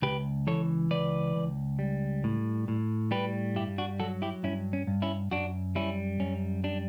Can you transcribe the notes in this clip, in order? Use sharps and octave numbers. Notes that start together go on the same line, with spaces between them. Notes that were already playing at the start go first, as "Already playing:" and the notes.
C#2 G4 B4
E3 A4 C#5
C#2 B4 D5
C#2
G3
A2
A2
G3 G4 B4
G2 E4 G4
D4 F#4
F#3 F#4 A4
E4 G4
G2 C#4 E4
C#4
G2
C#4 E4
F#2 D4 F#4
G3 C#4 E4
F#2 C#4
G3 D4